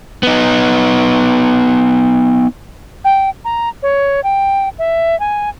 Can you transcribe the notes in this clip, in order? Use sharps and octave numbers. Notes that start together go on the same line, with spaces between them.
B3 D#4
G5
A#5
C#5
G5
E5
G#5